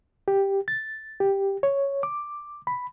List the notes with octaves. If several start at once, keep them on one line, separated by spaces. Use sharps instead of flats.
G4
A6
G4
C#5
D6
B5